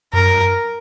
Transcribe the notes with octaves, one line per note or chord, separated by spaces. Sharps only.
F#2 A#4